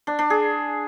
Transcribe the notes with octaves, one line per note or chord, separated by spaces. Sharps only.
D4
D4
G#4